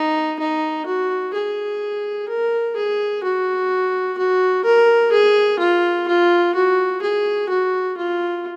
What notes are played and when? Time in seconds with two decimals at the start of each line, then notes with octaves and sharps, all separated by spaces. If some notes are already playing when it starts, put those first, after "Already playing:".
Already playing: D#4
0.40 D#4
0.86 F#4
1.34 G#4
2.29 A#4
2.76 G#4
3.23 F#4
4.18 F#4
4.65 A#4
5.12 G#4
5.59 F4
6.08 F4
6.55 F#4
7.02 G#4
7.49 F#4
7.97 F4